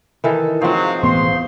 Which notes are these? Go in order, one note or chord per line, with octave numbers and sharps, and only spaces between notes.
D#3 E3 A4
G#2 F3 F#3 C4 G#4 C5 F5
E1 A1 B3 C6